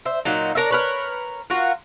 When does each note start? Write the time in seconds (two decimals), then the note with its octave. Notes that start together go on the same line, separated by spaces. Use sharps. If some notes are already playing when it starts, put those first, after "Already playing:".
0.06 C5 E5
0.25 A#2 F#3 D#4
0.55 D4 A#4 C#5 E5
0.70 A#4 B4 C#5
1.50 F4 F#4 A#4